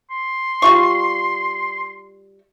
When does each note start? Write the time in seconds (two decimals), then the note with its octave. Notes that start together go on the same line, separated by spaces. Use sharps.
0.11 C6
0.62 G3 F4 C#6